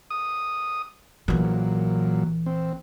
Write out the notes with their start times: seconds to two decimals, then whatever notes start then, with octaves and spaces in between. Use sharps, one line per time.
0.10 D#6
1.28 A#1 A#2 E3 F#3
2.46 C4